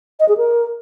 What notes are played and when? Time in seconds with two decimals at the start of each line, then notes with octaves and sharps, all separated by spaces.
0.20 D#5
0.28 G#4
0.37 A#4